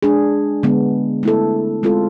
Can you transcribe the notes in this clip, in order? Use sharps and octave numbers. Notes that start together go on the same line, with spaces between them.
G#3 D4 G#4
D3 G#3 B3
A3 E4 A4
G#3 C4 F4 A4